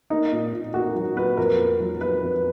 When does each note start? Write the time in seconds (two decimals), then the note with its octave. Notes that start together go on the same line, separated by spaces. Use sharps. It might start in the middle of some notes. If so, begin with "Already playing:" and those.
0.10 A#3 D#4
0.32 A#2
0.53 A#2
0.74 A#3 F#4
0.95 F#3
1.16 A#2 B4
1.37 F2 A#4
1.59 A#3
1.80 F#3
2.01 A#3 B4
2.22 F2